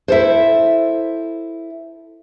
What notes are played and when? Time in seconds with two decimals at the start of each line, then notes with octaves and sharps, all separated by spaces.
0.08 E4 A4 C5